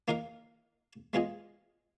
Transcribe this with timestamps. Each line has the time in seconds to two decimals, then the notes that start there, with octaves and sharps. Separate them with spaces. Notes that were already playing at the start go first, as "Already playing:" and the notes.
0.08 A#3 D#4 A#4 F5
1.13 G#3 B3 F4 G#4 D#5